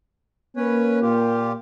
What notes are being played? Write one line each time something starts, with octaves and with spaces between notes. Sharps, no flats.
A#3 C#4 B4 C#5
A#2 F4 G4